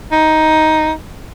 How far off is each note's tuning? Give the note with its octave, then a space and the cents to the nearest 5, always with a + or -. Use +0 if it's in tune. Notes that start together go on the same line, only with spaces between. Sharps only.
D#4 +10